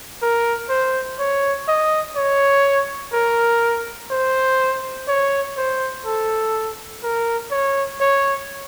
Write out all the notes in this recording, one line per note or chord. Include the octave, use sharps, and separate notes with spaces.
A#4
C5
C#5
D#5
C#5
A#4
C5
C#5
C5
A4
A#4
C#5
C#5